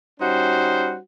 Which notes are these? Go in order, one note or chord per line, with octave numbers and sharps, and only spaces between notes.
G3 C#4 D#4 F#4 C5